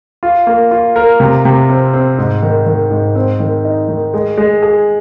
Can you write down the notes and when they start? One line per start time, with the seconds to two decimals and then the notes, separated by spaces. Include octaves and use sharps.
0.23 F4
0.47 A#3
0.71 F4
0.96 A#4
1.20 C3
1.45 C3
1.69 C4
1.93 C4
2.18 G#2
2.42 D#3
2.67 D#3
2.91 G#2
3.15 C4
3.40 D#3
3.65 D#4
3.89 D#3
4.14 G#3
4.38 G#3
4.62 G#4